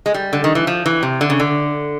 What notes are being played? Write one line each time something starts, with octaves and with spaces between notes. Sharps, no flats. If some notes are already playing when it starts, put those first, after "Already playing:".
G#3
G3
D3
D#3
E3
F3
E3
C3
D3
C#3
D3